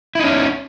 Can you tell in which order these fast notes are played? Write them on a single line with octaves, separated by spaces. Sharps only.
E4 D#4 C#4